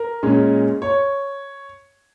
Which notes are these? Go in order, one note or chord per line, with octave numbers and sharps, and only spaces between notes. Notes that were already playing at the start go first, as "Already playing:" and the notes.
Already playing: A#4
A#2 G#3 C#4
C#5